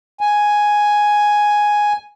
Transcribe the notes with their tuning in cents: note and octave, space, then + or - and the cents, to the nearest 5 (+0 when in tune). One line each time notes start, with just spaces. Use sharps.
G#5 +0